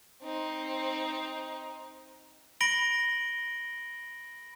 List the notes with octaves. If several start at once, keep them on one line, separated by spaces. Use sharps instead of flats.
C4 D#4
B5 A#6 D7 F#7 G7